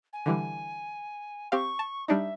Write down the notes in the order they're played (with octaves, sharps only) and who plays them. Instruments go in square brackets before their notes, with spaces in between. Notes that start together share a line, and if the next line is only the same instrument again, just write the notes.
[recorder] G#5
[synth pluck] D3 E3 G3
[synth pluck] C4 G4 F5 [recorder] C#6
[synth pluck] A5
[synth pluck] G3 D4 D#4 [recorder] E5